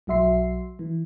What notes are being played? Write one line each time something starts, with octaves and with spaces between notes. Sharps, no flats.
B1 F#3 F#4 E5 C6 C7
E3